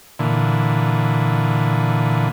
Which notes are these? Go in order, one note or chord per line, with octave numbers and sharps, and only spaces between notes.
A#2 D3 E3